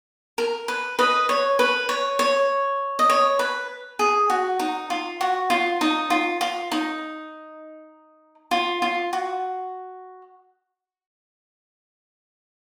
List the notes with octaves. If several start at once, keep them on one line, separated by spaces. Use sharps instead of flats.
A#4
B4
B4 D#5
C#5
B4
C#5
C#5
D#5
C#5
B4
G#4
F#4
D#4
F4
F#4
F4
D#4
F4
F4
D#4
F4
F4
F#4